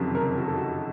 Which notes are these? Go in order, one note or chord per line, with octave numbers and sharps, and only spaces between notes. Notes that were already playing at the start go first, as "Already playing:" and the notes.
Already playing: F#1 F2 C3 D#3 F#3
A#4
F#4
A4
F#4